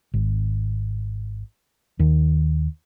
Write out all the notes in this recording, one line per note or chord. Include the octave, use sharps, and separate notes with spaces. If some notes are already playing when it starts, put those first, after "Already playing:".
G#1
D#2 D#3